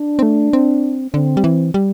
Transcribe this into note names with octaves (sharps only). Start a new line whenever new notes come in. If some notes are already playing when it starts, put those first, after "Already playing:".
Already playing: D4
C4
A3
C4
D3 C4
G3
E3
G3